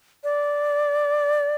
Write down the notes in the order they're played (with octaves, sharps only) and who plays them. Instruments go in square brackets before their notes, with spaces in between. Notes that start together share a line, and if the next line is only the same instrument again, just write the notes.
[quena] D5